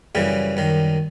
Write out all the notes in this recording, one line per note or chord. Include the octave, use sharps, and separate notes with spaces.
F#2 C#3 E3 G3
F#2 D#3